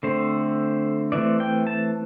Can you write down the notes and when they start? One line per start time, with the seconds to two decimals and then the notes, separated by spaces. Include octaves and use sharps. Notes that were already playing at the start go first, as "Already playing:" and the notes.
0.03 D3 A3 C4 C5
1.12 E3 A3 C4 D5
1.40 G5
1.67 A5